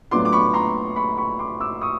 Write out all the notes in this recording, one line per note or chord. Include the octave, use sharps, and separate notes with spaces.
A2 F#3 B3 D4 F4 C6 D6
D6
B5 C#6
A#5 C6
B5 C#6
B5 C#6
C6 D6
D6 E6
C#6 D#6